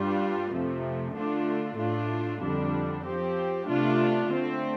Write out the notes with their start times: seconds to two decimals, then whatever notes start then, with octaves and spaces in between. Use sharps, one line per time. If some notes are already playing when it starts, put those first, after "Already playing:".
Already playing: G2 G3 D4 F4
0.52 F2 C3 F3 A3
1.15 D3 A3 D4 F4
1.78 A2 A3 D4 F4
2.41 F2 D3 G3 D4
3.04 F3 C4 G4
3.67 C3 A3 D4 F4
4.30 D3 A3 C4